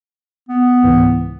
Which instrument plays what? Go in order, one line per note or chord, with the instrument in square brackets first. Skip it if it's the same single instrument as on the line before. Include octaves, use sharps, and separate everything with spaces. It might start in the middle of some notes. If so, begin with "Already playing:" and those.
[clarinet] B3
[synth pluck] C#2 G#2 E3